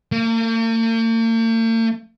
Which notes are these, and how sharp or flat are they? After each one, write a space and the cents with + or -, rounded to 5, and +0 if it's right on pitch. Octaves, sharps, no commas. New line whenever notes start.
A#3 -45